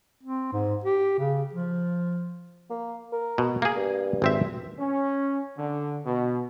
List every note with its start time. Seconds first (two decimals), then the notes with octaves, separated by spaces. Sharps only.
0.23 C4
0.53 G#2
0.84 G4
1.19 C#3
1.53 F3
2.70 A#3
3.13 A#4
3.38 B2
3.62 A#3 G#4
3.76 G2
4.22 G#1 C4 E5
4.79 C#4
5.58 D3
6.05 B2